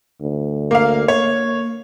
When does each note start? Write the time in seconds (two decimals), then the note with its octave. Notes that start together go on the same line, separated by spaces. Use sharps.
0.21 D2
0.71 A#3 F5
1.08 A#3 C#5